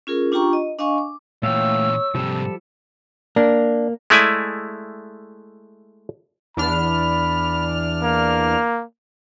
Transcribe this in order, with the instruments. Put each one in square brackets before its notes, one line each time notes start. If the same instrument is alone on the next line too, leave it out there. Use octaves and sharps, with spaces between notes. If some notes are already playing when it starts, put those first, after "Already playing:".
[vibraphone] C#4 F4 G#4 A#4
D4 F4 G4 G5 A#5 C#6
D#5
D4 D#5 F5 G#5 C#6
D6
[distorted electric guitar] A#2 E3 [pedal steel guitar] A3 F5 G5 [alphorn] C#5 [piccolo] E6
[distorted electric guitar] G#2 C3 [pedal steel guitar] F3 G3 A4
[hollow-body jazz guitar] A#3 [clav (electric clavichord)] D4
[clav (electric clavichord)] G#3 A3 E4 D5 G#5
[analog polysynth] E2 D4 F6 [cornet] B5
[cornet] A#3